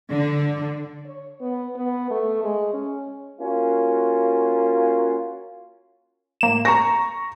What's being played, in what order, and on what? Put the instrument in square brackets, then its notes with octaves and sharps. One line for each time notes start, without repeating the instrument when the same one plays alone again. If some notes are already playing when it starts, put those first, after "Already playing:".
[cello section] D3
[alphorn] C#5
B3
B3
A3
G#3
C#4
[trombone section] A#3 C#4 F4 F#4
[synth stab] A2 A#3 E7
[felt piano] A#5 C#6 A#6